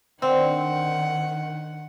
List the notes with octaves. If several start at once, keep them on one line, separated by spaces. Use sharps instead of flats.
D#3 C4 D4 F#5